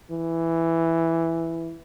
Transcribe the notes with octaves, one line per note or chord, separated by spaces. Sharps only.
E3